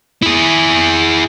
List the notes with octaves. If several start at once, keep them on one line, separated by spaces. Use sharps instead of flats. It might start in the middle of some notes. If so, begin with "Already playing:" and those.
E4 G#4